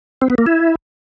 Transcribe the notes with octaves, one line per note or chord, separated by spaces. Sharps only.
C4
B3
A#3
E4